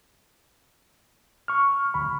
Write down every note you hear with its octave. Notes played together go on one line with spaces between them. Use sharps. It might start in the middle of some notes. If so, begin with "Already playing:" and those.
C#6 F6
D2 B5